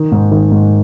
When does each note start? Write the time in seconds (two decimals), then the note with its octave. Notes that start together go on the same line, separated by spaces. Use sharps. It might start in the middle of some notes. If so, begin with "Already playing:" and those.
Already playing: D#3
0.12 G#2
0.31 D#3
0.51 G#2